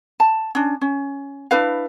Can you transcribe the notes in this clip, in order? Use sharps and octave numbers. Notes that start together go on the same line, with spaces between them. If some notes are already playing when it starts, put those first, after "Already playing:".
A5
C#4 D4
C#4
D4 E4 B4 F5